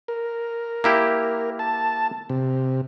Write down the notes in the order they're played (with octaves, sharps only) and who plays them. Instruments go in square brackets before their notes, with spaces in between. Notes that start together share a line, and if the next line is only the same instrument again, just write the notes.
[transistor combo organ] A#4
[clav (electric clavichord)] A#3 E4 G4
[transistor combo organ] A5
C3